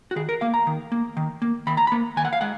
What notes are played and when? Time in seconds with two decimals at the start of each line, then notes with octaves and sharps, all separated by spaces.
0.11 F#4
0.16 D#3 G#4
0.29 A#4
0.41 A#3 F5
0.54 A#5
0.67 D#3
0.92 A#3
1.17 D#3
1.42 A#3
1.67 D#3 B5
1.77 A#5
1.87 B5
1.92 A#3
2.17 D#3 G#5
2.25 F#5
2.33 F5
2.41 G#3 F#5